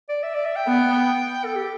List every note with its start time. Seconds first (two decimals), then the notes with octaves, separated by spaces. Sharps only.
0.09 D5
0.23 E5
0.34 D5
0.45 E5
0.56 G5
0.67 B3
1.45 A4
1.56 G4